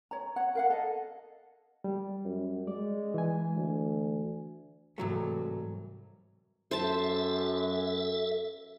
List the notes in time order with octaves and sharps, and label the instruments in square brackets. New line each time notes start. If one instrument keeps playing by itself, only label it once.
[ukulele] C#5 A#5
C#5 F#5
A#4 F5 F#5
A4 D#5
[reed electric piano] G3
[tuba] F#2
[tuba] G#3 [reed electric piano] D5
[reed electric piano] E3 G#5
[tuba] D2
[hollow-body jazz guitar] C2 F#3 A3 [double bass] G#2 E3
[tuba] F#2 [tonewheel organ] A4 E5 [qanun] C5 A5